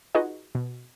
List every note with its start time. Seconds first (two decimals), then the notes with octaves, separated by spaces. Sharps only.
0.15 D#4 F4 F#4 G#4 B4 D#5
0.55 B2